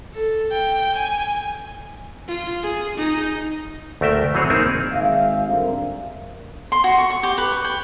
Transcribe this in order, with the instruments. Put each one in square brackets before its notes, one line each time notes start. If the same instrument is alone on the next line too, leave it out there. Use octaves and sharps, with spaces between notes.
[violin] A4
G5
G#5
[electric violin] F4
G#4
D#4
[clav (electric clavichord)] D2 A3 A#4 E5 G5
E3 F#3 C4 G#4 C#5
A#3 C4 D#4 G#4 A#4 A5
[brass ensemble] G#1 G#4 E5 F5
G2 D3 C4 A#4
[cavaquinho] C6
F#4
C#6
C#6
G4
B4
C#6
G5